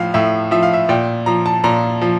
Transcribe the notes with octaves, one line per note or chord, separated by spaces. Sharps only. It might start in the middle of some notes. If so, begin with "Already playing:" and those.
Already playing: A2 F3 F5
A2 E5
F3 E5
F5
E5
A#2 G5
F3 A#5
A5
A#2 A#5
F3